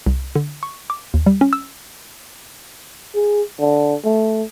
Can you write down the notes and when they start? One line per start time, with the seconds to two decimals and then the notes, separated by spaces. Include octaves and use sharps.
0.06 C2
0.36 D3
0.63 C#6
0.90 D6
1.14 D#2
1.26 G3
1.41 C#4
1.53 E6
3.15 G#4
3.60 D3
4.04 A3